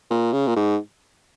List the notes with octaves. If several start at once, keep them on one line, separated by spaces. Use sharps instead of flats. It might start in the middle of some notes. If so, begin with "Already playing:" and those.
A#2
C#3
A#2
G#2